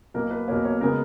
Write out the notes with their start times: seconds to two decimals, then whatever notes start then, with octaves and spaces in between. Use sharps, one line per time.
0.14 B1 B2 A#3 A#4
0.31 B4
0.48 B1 B2 A#3 C#5
0.64 C#5
0.81 C#3 G#3 B3 A#4